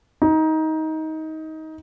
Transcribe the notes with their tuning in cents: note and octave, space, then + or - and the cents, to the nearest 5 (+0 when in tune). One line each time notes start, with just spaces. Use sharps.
D#4 +20